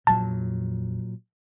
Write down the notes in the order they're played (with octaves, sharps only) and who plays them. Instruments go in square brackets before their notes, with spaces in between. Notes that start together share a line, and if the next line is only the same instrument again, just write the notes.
[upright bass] A#1 F2 [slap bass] A#2 F#3 [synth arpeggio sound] A5